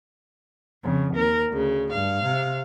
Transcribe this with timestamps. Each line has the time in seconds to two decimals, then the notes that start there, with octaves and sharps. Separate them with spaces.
0.84 F2 C#3
1.15 D#2 A#4
1.52 D2 C#3
1.92 G2 F5
2.25 C3